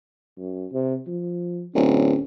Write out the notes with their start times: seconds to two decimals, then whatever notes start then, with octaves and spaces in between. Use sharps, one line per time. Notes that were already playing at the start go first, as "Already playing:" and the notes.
0.37 F#2
0.72 C3
1.07 F3
1.75 D1 C#4